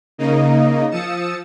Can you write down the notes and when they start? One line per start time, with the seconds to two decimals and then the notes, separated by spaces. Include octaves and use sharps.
0.18 C#3 A#3 D#4 D#5
0.91 F3 D#6 E6 A6 C#7 E7